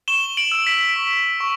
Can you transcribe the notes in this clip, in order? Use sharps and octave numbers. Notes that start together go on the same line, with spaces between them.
C#6 E7 G7
D7 F#7
E6
B6 D7
C#6
C#6